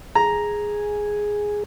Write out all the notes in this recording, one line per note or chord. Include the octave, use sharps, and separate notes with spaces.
G#4 A#5